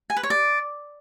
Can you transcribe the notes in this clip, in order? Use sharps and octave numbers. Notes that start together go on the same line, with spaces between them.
G#5
B4
C#5
D5